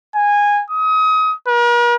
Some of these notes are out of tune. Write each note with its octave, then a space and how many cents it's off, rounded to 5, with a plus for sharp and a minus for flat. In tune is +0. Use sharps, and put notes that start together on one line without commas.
G#5 -15
D#6 +30
A#4 +45